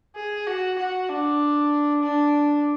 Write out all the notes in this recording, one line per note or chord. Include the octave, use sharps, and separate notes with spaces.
G#4
F#4
F#4
D4
D4